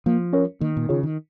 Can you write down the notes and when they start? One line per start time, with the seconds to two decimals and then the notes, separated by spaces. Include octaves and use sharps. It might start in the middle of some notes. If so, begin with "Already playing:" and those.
0.06 F3 A#3
0.33 C#4 A#4 C#5
0.61 D#3 A#3
0.77 A#2
0.89 C#3 F4 G#4 C#5
1.03 D#3